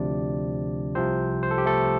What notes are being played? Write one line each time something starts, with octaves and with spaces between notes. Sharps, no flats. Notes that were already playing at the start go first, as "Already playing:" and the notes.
Already playing: D2 C3 F3 D4 D5
C2 C3 F3 C4 C5
C5
A4
G4
A3 A4